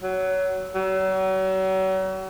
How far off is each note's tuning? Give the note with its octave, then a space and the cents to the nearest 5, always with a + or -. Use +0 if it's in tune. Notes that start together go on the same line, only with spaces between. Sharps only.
F#3 +20
F#3 +40